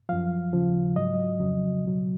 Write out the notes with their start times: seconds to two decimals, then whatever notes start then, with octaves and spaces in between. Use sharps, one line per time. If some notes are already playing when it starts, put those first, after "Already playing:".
0.09 F#2 F3 F5
0.53 D#2 C#3 F3
0.96 G#2 F#3 D#5
1.40 F2 C#3 F#3
1.84 C#2 B2 F#3